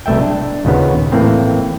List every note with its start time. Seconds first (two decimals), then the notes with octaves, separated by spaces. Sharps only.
0.06 C2 B2 A3 E5 G5
0.21 D4
0.65 D#2 A#2 C#3 B3
1.12 A2 E3 A#3 C4